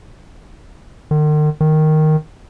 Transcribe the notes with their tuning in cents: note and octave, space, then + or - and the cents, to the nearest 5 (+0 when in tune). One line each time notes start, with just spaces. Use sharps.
D#3 -45
D#3 -5